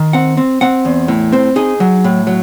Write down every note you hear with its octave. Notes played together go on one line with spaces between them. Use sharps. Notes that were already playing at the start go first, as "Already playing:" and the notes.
Already playing: D#3
C4 F#5
C4
C4 F#5
E2
A2
C4 C5
D#4 G#4
F#3
A2
F#3